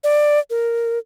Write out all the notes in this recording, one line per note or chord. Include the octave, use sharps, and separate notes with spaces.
D5
A#4